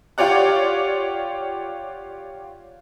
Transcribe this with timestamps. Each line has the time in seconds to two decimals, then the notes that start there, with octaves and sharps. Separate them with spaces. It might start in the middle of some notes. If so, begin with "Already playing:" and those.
0.18 F4 G4 C#5 D5 F#5